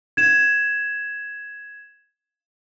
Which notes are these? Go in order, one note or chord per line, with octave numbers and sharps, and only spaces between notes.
G#6 E7